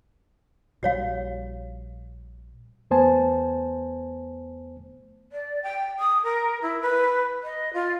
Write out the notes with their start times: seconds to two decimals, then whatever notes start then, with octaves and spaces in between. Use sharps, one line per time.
0.83 A#1 G3 F#4 C#5 F5
2.91 E2 A3 B3 C5 G#5 A5
5.32 D5
5.63 G5
5.99 D#6
6.24 A#4
6.62 E4
6.81 B4
7.43 D#5
7.73 F4